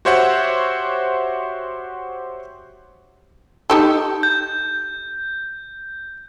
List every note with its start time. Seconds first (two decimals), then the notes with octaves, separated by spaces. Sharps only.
0.05 F#4 G4 C5 C#5 E5 F#5
3.70 D#4 G4 A4
4.23 G6